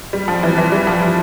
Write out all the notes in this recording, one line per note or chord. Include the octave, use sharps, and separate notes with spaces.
G3
F3
E3
E3
G3
F3